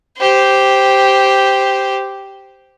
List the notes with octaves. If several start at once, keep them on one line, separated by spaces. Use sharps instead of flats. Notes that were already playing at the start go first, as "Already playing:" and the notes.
G4 C5